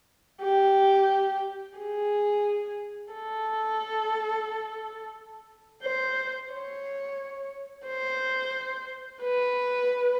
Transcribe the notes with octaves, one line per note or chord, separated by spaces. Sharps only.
G4
G#4
A4
C5
C#5
C5
B4